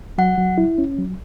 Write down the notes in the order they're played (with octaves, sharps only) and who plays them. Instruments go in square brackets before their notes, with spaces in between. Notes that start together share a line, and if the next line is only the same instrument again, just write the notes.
[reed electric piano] F#3 [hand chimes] F#5
[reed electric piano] F#3
E4
C#4
F#3